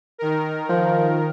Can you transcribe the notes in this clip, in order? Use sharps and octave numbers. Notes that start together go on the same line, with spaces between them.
D#3 A#4
F3